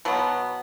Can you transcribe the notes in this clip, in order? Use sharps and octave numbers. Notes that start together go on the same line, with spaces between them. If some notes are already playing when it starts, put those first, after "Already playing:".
B2 F#3 B3